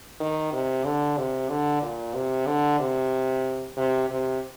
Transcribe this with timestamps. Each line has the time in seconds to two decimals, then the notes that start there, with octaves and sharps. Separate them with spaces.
0.20 D#3
0.53 C3
0.85 D3
1.17 C3
1.49 D3
1.82 A#2
2.14 C3
2.47 D3
2.79 C3
3.77 C3
4.09 C3